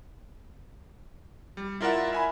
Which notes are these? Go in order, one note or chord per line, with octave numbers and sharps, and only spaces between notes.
G3
E4 F4 A#4 D5 E5 F#5
E5 G#5 B5